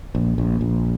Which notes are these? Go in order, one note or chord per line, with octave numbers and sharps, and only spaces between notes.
A#1
A#1
A#1